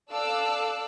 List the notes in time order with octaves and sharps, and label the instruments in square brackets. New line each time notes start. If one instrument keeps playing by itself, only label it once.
[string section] A4 D5 F5 D6 E6 F#6